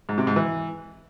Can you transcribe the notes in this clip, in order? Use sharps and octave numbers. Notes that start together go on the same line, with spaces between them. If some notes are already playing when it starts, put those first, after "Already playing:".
G#2
C3
G#2
E3